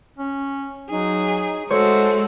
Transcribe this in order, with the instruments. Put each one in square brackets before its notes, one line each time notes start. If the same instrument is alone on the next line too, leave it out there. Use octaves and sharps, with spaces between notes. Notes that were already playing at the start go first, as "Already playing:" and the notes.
[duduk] C#4
[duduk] F#3 [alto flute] D#4 [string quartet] G#4
[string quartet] G#3 A3 F#4 [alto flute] A4 [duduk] C5 [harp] C#5